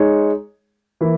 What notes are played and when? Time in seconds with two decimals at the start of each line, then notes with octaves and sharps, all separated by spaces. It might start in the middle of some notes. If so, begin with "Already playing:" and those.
Already playing: G#3 D#4 G#4 C#5
1.01 E3 A#3 E4